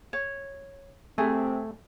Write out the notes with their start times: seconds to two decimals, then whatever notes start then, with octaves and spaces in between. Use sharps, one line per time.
0.13 C#5
1.18 C3 A3 C4 G#4 E5